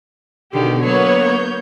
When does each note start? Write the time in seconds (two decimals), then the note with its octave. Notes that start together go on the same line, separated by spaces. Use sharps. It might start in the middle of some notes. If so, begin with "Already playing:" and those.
0.52 B2 D3 D#3 G4
0.83 F#3 A#3 B3 B4 C#5
1.20 G6